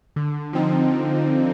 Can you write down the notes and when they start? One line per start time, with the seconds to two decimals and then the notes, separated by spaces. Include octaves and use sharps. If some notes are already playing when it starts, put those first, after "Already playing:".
0.16 D3
0.53 F3 C4 D#4